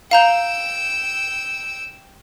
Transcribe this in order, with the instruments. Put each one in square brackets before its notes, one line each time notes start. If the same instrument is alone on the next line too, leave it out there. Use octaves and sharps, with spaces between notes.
[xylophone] F5 A#5 G6 [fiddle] G5 E6